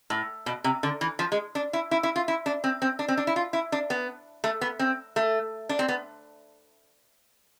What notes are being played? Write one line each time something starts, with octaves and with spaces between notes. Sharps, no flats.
A2
B2
C3
D3
E3
F3
G#3
D4
E4
E4
E4
F4
E4
D4
C4
C4
D4
C4
D4
E4
F4
E4
D4
B3
A3
B3
C4
A3
D4
C4
B3